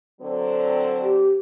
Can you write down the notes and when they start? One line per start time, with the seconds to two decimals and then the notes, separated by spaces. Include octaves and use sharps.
0.21 D3 F#3 C4
1.02 G4